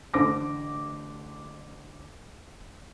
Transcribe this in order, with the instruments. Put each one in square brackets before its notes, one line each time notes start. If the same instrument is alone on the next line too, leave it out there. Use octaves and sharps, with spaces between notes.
[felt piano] A1 D3 C5 D6 A#6